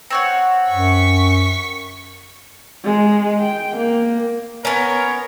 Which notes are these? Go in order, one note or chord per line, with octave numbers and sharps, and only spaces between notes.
C4 C#5 F#5
F#2 C#6 B6
G#3
G5
A#3
B3 C#4 A#4 C#5